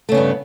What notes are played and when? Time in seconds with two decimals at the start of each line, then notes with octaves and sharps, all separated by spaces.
0.09 A3
0.12 C#3
0.14 B3
0.17 G2